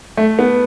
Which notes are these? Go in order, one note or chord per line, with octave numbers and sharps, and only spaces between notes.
A3
B3